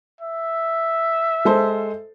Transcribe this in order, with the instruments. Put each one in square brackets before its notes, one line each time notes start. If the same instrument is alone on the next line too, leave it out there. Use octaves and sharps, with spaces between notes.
[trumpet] E5
[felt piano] G#3 A4 C5